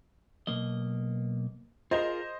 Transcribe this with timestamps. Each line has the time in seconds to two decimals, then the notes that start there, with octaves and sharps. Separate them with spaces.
0.47 B1 A#3 D#5
1.91 F4 G#4 A#4 C5 D#5